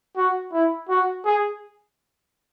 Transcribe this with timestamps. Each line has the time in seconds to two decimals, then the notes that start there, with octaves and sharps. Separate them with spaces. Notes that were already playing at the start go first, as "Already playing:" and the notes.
0.17 F#4
0.53 E4
0.89 F#4
1.25 G#4